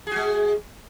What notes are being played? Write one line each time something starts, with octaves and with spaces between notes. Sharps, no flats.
G#3 F#4 G#4